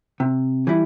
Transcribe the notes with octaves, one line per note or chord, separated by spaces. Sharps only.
C3
E3 G3 E4